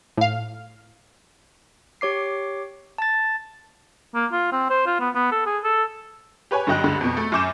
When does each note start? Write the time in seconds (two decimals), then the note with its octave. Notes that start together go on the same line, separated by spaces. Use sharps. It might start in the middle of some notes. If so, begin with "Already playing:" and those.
0.17 A2 F5
2.01 G4 C#5 D6 C7
2.98 A5 A6
4.14 A#3
4.32 F4
4.52 C4
4.70 C5
4.87 F4
5.00 B3
5.15 B3
5.32 A4
5.46 G#4
5.64 A4
6.51 G4 B4 C#5 G#5
6.67 G2 D3 F#3 D#5 G5 F#6
6.84 C#2 G2 D3
7.01 F2 B2
7.17 A3
7.32 F#2 G#5 D6 G6 E7